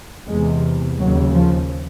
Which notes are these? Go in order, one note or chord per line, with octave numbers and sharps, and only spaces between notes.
E2 C3 G#3
D#2 C#3 F#3
F3